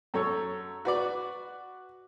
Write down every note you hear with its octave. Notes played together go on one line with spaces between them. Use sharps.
F#2 A4 C#5
F#4 B4 D5